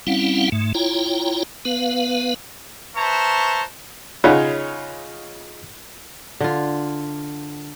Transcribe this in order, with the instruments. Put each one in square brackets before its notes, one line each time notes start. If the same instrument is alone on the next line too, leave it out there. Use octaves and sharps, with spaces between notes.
[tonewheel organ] G3 C4 C#4 E4 F5 F#5
G#2 A3
E4 F4 C#5 G5 A#5
B3 B4 F5
[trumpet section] B4 C5 E5 A5 A#5 C#6
[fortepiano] C#3 D#4 F4 C#5 F#5 B5
[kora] D3 F4